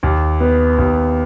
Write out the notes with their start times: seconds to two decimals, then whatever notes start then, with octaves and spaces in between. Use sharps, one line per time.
0.03 D#2
0.40 B3
0.78 D#2